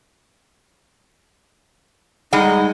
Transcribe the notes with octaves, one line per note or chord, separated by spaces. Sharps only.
G3 G#3 D#4 F#5